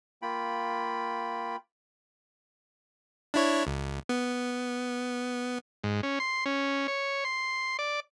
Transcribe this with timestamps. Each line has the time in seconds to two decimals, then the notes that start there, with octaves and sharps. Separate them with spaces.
0.22 A#3 F4 G5 B5
3.34 D4 E4 C#5
3.67 C#2
4.09 B3
5.84 G#2
6.03 C#4
6.20 C6
6.46 C#4
6.88 C#5
7.25 C6
7.79 D5